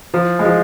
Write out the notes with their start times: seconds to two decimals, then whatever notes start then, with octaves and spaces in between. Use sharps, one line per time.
0.14 F3
0.39 G#3
0.45 F3